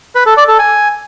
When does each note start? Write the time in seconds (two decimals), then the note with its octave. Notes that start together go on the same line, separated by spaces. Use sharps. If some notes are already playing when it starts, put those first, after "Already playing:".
0.15 B4
0.26 A4
0.37 D5
0.48 A4
0.59 G#5